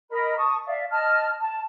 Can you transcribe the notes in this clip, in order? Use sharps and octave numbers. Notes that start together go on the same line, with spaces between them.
A#4 D#5 B5
A5 C#6 D#6
D5 E5 F5
D#5 A5 F6
A5